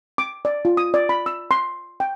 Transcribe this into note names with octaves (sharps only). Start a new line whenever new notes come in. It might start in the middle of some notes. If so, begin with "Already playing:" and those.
D6
D5
F4
D#6
D5
B5
E6
C6
G5